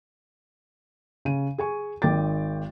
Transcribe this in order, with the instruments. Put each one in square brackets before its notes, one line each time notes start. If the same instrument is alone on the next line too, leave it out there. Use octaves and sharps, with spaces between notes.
[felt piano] C#3 D#7
G#4 G#5 C#6
G#1 D#3 G5 D6 A6